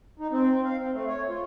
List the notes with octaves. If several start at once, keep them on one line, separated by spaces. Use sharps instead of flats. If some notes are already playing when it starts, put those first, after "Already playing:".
D#4
C4
F5
C4
A3
C#5
F4